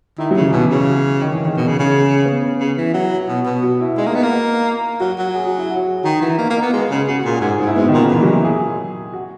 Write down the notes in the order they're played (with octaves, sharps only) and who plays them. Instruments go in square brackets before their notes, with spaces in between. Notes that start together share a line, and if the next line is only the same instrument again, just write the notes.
[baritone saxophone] D#3 [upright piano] E4
[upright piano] F#3
[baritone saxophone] C#3
[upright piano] E3
[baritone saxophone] B2 [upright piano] E3
[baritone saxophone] C#3
[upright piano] D#3
E3
D#3
[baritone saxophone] B2 [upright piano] E3
[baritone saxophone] C#3
C#3
[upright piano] B3
C#4
[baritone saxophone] C#3
E3
[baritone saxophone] F#3 [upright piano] E4
[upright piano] F#4
[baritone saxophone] B2
B2
[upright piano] F#4
E4
[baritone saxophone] G#3 [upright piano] D#4
[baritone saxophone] A#3
[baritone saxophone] B3 [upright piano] D#4
[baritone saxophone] A#3
[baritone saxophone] F#3 [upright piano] F#4
[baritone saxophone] F#3
[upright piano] G#4
F#4
E4
F#4
G#4
[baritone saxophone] D#3 [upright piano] F#4
[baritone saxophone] E3 [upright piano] F#4
[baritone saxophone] A#3 [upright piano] D#4
[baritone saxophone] A#3
[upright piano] D#4
[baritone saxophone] B3
[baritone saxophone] G#3 [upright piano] F#4
[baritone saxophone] C#3 [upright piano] F#4
[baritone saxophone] C#3 [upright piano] F#4
[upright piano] F#4
[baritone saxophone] A#2 [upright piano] G#4
[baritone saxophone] G#2 [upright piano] F#4
[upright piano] G#4
[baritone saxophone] G#2 [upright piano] F#4
[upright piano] E4
[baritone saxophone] G#2 [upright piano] B3
[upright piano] D#3
[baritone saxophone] A#2
[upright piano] C#3
[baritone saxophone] A#2 [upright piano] E3
[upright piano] F#3
E4
G#4
F#4